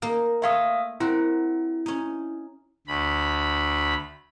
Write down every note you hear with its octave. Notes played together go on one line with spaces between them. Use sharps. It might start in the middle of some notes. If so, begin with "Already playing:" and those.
A#3 D#4 A#4
A3 C#5 E5 F5 C6 D#6
C4 E4 F#4 A#4
C#4 D#4
D2 B5